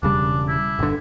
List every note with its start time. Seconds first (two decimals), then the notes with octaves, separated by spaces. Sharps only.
0.03 E1 C#3 G3 D4
0.48 E4
0.79 G1 D3